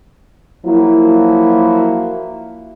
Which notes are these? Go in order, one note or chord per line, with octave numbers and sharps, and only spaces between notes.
F3 F#3 A#3 E4